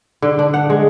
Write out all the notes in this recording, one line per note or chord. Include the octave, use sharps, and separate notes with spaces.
D3
D4
F#5
G#3